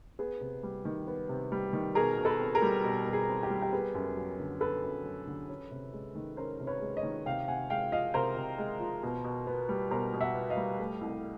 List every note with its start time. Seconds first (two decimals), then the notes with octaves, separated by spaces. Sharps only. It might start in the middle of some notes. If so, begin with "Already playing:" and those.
0.19 B3 G#4
0.41 C3
0.63 G3
0.85 D#3
1.07 B3
1.29 C3
1.52 G3
1.73 D#3
1.95 B2 G#4 A#4
2.18 B2
2.25 A4 B4
2.40 C4
2.55 G#4 A#4
2.62 G3
2.84 B2
3.06 B2
3.13 G#4
3.29 C4
3.43 G4
3.50 G3
3.62 G4
3.73 B3 G#4
3.95 F#2
4.17 F#3
4.39 D3
4.61 B3 A4 B4
4.83 F#2
5.04 F#3
5.27 D3
5.49 C#4
5.71 C3
5.93 G#3
6.15 D#3
6.37 C#4 A#4 C5
6.60 C3
6.67 B4 C#5
6.81 G#3
6.97 C#5 D#5
7.03 D#3
7.26 C3 F5 G5
7.48 C3 F#5 G#5
7.70 G#3 F5 G5
7.92 F3 D#5 F5
8.14 C3 A#4 C5
8.37 C3
8.58 G#3
8.80 F3
9.03 B2
9.24 B2
9.47 B3
9.69 G3
9.91 B2 A#4 C5
10.14 B2
10.20 E5 F#5
10.35 B3
10.50 D#5 F5
10.57 G3
10.79 A3
11.01 C2